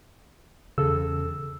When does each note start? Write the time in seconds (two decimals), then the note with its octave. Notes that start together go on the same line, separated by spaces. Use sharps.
0.78 E2 C#3 A4 E6